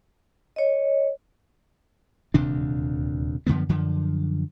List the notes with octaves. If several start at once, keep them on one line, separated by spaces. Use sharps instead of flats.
C#5 D#5
D#1 D2 C3 D4
F#2 D3 F3 B3
F#2 D3 F3